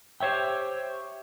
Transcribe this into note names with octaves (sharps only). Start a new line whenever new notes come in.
G4 C5 C#5 E5 G5